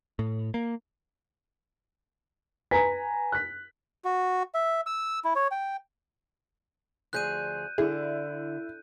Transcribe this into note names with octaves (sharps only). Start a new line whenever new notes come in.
A2
A#3
B4 G#5 A#5 B6
F#6 B6
F#4
E5
E6
E4
C#5
G5
D2 F3 G#4 F#6 G6 D#7
D3 E4 G#4